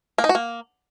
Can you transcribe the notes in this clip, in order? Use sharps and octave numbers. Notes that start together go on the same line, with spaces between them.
A#3
D#4
F#4
A#3